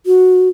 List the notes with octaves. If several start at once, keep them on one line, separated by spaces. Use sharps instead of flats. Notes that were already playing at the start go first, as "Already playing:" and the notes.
F#4